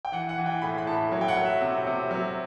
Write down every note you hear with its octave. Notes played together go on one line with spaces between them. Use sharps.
G5
E3 F#5
F#5
E3
G5
A2 B5
B5
A2 A5
F#3
G5
F#5
F#3
E5
C3
C3
F#3